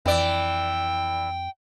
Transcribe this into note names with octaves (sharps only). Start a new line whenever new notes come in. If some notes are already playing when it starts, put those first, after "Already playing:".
F2 E3 D5 G5